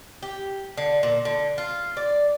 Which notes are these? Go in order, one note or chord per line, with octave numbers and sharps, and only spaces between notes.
G4
D3
A#2
D3
F4
D5